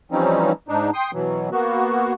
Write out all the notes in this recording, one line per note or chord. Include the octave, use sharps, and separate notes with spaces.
E3 F3 G3 C4 C#4 D#4
G#2 D4 D#4
G5 C6 D#6
B2 E3 F#3
A#3 B3 F#4